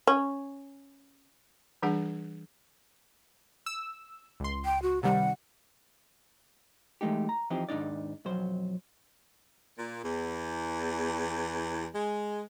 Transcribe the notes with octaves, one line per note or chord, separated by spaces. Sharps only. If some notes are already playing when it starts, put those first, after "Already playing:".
C#4
E3 G3 D4 G#4 F#5
E6
C#2 C6
G5
F#4
C3 D#3 G3 F#5
E3 G#3 A3 D#4 G4
A#5
E3 F3 C4 D#4 G4
D#2 G#2 D4 D#4 D5
B1 F2 F#3 C5
A#2
E2
G#3